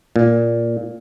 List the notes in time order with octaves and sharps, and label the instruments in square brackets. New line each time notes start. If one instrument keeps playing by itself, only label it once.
[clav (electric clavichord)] A#2